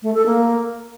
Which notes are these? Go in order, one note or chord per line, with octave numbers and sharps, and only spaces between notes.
A3
A4
A#3